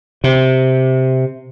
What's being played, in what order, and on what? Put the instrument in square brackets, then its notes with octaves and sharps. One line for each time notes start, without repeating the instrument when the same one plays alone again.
[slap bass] C3